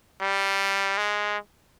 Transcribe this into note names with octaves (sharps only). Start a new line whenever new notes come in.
G3
G#3